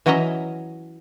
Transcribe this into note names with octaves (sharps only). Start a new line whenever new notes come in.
E3 F#3 C#4 D#5 E5 A#5